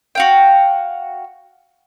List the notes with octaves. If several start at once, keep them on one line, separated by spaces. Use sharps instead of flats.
F#4 F5 G5